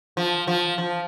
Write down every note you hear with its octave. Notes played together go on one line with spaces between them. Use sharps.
F3
F3
F3